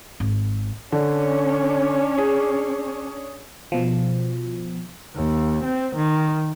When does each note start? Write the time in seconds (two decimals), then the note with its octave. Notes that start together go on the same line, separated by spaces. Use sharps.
0.20 G#1
0.92 D3 C#4 D4 C#5
2.18 G#4
3.72 B2 F3
5.15 D#2
5.64 C4
5.95 D#3